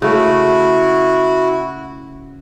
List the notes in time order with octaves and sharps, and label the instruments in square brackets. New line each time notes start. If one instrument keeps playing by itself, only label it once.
[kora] C#3 A3 [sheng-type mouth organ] E4 F#4